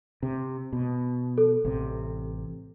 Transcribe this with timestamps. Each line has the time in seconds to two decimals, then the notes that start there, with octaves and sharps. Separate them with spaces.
0.23 C3
0.73 B2
1.38 A4
1.65 A1 C3